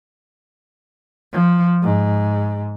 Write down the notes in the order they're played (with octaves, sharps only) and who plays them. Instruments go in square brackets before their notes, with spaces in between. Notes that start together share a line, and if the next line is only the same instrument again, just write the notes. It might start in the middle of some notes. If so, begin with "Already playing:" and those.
[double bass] F3
G#2